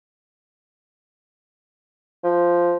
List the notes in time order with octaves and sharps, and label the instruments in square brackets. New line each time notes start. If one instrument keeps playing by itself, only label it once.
[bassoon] F3